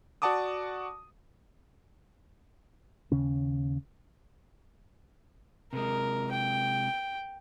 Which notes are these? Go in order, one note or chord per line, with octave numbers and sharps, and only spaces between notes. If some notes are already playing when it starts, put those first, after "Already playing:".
F#4 D5 F#5 A5 D6 D#6
D#2 C#3 C#4
C3 G#3 A#4
G5